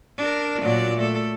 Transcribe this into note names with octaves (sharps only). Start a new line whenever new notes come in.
D4 A#4
A#2 F#3 D5
A3 A4